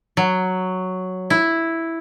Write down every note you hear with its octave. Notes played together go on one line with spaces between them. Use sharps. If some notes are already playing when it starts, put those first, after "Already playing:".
F#3
E4